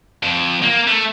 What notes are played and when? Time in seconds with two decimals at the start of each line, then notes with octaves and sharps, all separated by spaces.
0.23 F2
0.63 A#3
0.88 A3